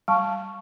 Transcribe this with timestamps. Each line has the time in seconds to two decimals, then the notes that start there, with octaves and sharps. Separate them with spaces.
0.08 G3 A5 C#6